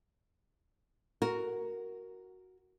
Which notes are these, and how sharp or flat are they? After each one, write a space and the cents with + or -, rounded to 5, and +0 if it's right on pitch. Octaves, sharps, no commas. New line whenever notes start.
F#4 +0 A#4 +0